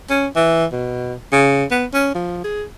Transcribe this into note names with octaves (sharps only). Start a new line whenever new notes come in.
C#4
E3
B2
C#3
B3
C#4
F3
G#4